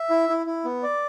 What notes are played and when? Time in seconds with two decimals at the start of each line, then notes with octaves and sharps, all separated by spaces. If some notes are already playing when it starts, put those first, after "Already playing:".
Already playing: E5
0.10 E4
0.29 E4
0.46 E4
0.65 B3
0.83 D5